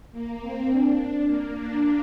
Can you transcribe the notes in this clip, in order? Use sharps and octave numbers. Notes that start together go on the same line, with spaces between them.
A#3
C4
D4
A#3
D4